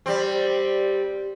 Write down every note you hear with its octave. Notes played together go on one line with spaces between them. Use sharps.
G3 C4